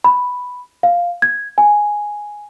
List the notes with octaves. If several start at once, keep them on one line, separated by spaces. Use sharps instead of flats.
B5
F5
G#6
G#5